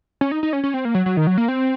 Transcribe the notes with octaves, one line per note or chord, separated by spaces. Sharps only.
C#4
D#4
D#4
C#4
C#4
C4
A#3
F#3
F#3
D#3
F#3
A#3
C4